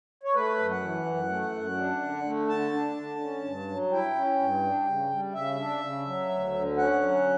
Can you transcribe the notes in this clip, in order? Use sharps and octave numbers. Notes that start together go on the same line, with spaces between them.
C#5
A3 B4
F#2
F#5
E3
F#2
A3
F#2
D4
D3
A3
D3 A5
D4
D3
C#4
G2
F#3
E4 G5
C#4
G2
D4
C#3
G3
C#3 E5
D4
C#3
F#3
D2
D3
C#4 F#5
F#3